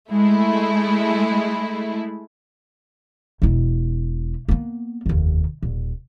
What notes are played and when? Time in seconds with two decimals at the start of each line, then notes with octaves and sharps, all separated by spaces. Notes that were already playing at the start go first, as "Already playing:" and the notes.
0.11 G#3 A3 E4
3.42 E1 E4
4.49 A#3 B3
5.06 F1 D#2
5.62 D#1